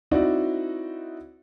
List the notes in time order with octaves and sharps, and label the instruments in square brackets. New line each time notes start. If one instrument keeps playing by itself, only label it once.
[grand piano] C4 D#4 E4 F#4 D5